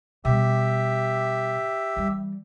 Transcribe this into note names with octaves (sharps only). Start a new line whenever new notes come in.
B2 G3 G4 E5
E3 G3